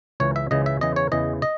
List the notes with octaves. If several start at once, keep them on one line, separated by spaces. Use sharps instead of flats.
C#2 C#3 E3 C#5
E5
C#2 C#3 E3 D#5
E5
E2 C#3 E3 D#5
C#5
E2 C#3 E3 D#5
D#5